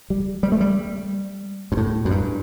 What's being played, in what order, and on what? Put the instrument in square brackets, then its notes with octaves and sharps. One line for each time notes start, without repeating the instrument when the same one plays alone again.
[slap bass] G3
G3
A3
G3
G2
A2
F#2
G2